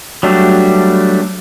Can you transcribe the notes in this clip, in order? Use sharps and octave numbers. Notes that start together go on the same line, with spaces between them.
F#3 G3 A3 D4